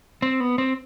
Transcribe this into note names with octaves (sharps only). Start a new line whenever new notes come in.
C4
B3
C4